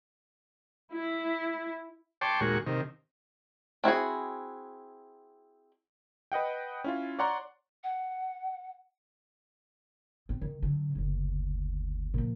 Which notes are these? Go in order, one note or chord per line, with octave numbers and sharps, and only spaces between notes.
E4
C#5 G5 A5 C6 D6
D#2 A#2 G#3 F#4 C#6
C3 D#3
C4 E4 F#4 G#4
B4 D#5 F#5 G5
C#4 E4 F4
C#5 D5 F#5 A#5 C6 C#6
F#5
C4
D#3
D3 F#3
F#1 D2
A#2 F3